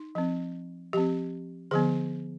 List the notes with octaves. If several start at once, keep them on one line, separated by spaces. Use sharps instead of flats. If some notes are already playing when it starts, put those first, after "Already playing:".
Already playing: D#4
F3 C4
F3 C4 G4
D3 F3 B3 G#4